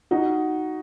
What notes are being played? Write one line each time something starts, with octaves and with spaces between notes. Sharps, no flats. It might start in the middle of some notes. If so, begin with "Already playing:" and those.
D#4 F#4